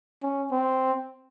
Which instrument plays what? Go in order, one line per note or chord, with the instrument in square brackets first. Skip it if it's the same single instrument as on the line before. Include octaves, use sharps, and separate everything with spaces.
[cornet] C#4
C4